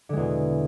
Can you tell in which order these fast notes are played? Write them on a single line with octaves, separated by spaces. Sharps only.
D3 G#3 E2 B2